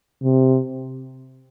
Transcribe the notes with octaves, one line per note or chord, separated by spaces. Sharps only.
C3